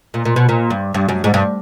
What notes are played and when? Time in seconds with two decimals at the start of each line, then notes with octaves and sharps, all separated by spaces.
0.14 A#2
0.25 A#2
0.36 B2
0.49 A#2
0.70 G2
0.94 G2
1.09 F#2
1.24 G#2
1.34 G2